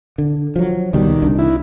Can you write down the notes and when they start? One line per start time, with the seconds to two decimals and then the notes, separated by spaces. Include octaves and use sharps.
0.18 D3
0.56 F3 F#3
0.93 C#2 B2 D#3 G3
1.22 C2 D4
1.39 E4